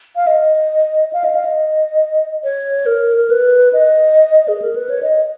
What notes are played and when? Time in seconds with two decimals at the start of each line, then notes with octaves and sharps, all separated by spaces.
0.16 F5
0.27 D#5
1.13 F5
1.24 D#5
1.35 F5
1.45 D#5
2.43 C#5
2.86 A#4
3.18 A#4
3.30 B4
3.73 D#5
4.48 G#4
4.62 A#4
4.76 B4
4.90 C#5
5.02 D#5